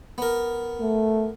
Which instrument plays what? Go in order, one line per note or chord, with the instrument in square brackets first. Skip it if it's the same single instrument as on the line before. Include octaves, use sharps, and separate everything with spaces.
[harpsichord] B3 A#4
[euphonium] A3